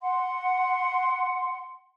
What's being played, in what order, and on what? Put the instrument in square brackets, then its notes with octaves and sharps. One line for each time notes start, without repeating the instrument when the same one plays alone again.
[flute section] F#5 C6